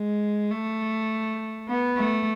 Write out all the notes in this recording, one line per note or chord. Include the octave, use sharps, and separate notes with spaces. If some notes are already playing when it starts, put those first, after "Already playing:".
Already playing: G#3
A3
B3
A3